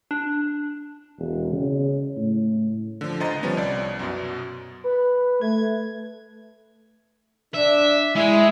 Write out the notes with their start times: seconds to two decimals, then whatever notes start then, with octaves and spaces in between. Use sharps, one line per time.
0.11 D4
1.19 E1
1.53 C#3
2.16 A2
3.01 D3 F3
3.20 C#2 C5 D#5 A#5 A6
3.43 F3 G3 B3 C#4
3.57 C2 D5
3.99 F#2 B2
4.84 B4
5.41 A3 G#6
7.54 D4 E5
8.15 G#3 E4